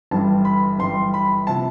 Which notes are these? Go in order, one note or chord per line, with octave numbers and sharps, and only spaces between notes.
G1 G2 E3 G3 A5
B5
G1 G2 E3 G3 C6
B5
C3 F3 A5